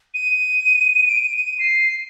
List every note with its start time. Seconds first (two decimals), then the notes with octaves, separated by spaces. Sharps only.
0.14 D#7
1.09 D7
1.17 D#7
1.59 C7